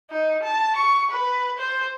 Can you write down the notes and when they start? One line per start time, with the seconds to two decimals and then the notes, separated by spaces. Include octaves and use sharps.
0.10 D#4
0.43 A5
0.76 C#6
1.11 B4
1.58 C5